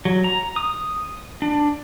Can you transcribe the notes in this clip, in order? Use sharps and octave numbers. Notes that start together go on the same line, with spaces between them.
F#3
A#5
D#6
D4